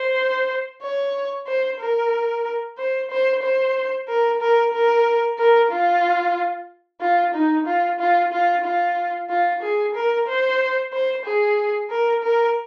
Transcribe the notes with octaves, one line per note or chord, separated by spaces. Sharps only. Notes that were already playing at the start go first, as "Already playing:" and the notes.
Already playing: C5
C#5
C5
A#4
C5
C5
C5
A#4
A#4
A#4
A#4
F4
F4
D#4
F4
F4
F4
F4
F4
G#4
A#4
C5
C5
G#4
A#4
A#4